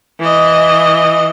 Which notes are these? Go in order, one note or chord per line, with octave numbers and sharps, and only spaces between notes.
E3 D#5